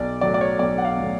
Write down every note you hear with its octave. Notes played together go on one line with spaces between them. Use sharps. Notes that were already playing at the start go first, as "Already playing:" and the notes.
Already playing: B1 D5
A2 F#3 D5
D5
C#5
B1 D5
F#5
F5
A2 F#3